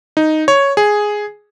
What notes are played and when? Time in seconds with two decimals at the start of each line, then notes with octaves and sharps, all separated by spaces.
0.17 D#4
0.48 C#5
0.77 G#4